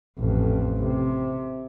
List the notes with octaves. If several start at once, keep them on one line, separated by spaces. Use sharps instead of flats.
A1 F2
C3